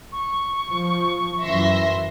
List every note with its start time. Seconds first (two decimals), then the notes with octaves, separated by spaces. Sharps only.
0.12 C#6
0.70 F3
1.43 F#2 E3 E5 C6 A#6